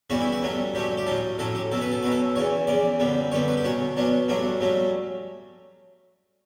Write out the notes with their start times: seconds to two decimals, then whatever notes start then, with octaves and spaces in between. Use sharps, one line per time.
0.10 C#3 E3 G3 B3 F#4
0.21 E4
0.32 F#4
0.42 G2 F#3 A3 C#4
0.74 G2 F#3 A3 C#4 G4
0.97 G4
1.06 A2 F#3 C#4 A4
1.38 A2 F#3 C#4 A4
1.55 G4
1.72 B2 F#3 C#4 A4
1.81 B4
1.91 A4
2.03 B2 F#3 C#4 B4
2.12 A4
2.35 E2 C#3 E3 C#5
2.67 E2 C#3 E3 D5
3.00 F#2 D3 G3 B3
3.32 F#2 D3 G3 B3 C#5
3.48 B4
3.57 G4
3.64 B2 F#3 C#4 F#4
3.96 B2 F#3 C#4 D4
4.28 G2 F#3 A3 C#4 D4
4.60 G2 F#3 A3 C#4